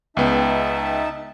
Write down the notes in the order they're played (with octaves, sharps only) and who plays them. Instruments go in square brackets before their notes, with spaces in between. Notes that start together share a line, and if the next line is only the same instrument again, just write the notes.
[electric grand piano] C#2 B3 G5 [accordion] D#4 E5 A5